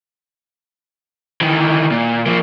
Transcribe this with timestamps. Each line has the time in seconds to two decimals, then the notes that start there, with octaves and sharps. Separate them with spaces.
1.41 D#3 E3
1.91 A#2
2.27 F3 A#3